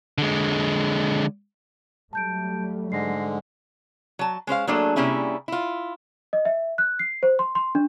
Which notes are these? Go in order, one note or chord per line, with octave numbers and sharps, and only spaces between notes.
D3 G#3
F#3 G3 A3 A5 G6 D7
G#2 D3 G#3 A#6 C7
F#3 A5
G#3 C#4 C5 F5
F#3 A3 A#3 D4 G#4 A4
C3 G3 A#3 C#4 E4 G#4
E4 F4
D#5
E5
F#6
C7
C5
C6
C6
D4